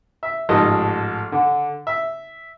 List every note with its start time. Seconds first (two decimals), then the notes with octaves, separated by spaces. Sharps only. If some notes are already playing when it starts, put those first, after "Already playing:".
0.23 E5
0.49 A1 G#2 F3 A4 D#5
1.32 D3
1.87 E5